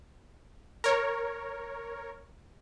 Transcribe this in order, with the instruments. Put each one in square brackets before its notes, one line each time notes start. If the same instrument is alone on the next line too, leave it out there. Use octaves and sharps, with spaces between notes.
[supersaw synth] A#4 C#5